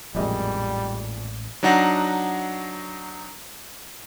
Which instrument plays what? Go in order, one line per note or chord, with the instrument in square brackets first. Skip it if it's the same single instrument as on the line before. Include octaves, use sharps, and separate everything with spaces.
[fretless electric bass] A1 G#3 [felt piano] F2 A#2 D#5 [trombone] G3
[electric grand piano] F#3 D4 D#4 F#5 A#6